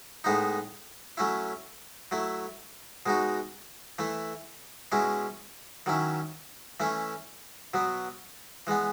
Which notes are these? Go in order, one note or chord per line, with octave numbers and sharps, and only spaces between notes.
A2 G#3 B3 D#4
F#3 A3 C#4 E4
F#3 A3 E4
B2 G#3 D#4 F#4
E3 A3 E4
B2 G#3 C#4 E4
D#3 F#3 C#4 E4
E3 A3 C#4 E4
B2 F#3 B3
E3 G#3 B3